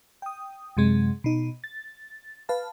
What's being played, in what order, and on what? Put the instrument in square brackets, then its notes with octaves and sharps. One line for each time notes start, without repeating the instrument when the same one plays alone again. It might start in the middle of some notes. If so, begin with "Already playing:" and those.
[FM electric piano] G5 D#6
F#2 C3 G#3
B2 D#4
A6
B4 F5 A5